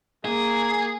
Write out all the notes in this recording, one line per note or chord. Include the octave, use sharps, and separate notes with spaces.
A#3 G#4